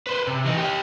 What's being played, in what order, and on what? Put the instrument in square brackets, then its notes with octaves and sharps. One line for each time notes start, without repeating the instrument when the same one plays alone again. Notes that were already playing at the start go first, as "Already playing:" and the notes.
[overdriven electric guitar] B4 C5
C3
E3 D#4
G4 D#5